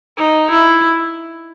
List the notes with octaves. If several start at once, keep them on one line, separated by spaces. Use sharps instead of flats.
D#4
E4